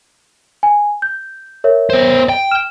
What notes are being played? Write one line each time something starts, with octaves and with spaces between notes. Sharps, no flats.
G#5
G6
A#4 C#5 E5
B3 C5
G5
F6 E7